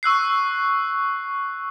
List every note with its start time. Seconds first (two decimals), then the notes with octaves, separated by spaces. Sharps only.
0.03 C#6 E6 F#6 C7